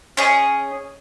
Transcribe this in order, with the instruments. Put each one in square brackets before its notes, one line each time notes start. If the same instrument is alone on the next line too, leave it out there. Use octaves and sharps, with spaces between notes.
[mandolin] C#4 G#4 D#5